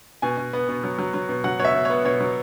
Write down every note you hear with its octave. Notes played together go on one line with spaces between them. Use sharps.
B2 G#5
B2
B3
B2
F#3
F#3
F#3
B2
F#3 F#5
B2 C#5
E5
B2
C#5
B3
B2 C#5
F#3